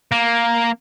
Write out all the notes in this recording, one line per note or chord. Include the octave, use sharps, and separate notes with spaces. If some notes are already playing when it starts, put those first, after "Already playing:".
A#3